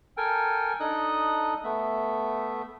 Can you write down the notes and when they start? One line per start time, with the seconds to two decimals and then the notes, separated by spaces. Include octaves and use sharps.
0.17 A4 A#4 G5 G#5
0.80 D4 D#4 A4 D#5 D#6 F#6
1.64 A3 B3 E5